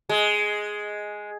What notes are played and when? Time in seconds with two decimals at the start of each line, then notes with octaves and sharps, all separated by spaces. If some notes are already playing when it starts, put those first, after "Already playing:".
0.09 G#3